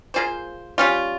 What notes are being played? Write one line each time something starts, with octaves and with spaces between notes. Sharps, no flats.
A#3 F4 G#4 C5
G3 C#4 F4